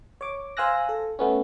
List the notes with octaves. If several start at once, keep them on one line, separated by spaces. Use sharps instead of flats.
C#5 D6
C5 F5 G#5 E6 F#6 A#6
A4
A3 B3 C#4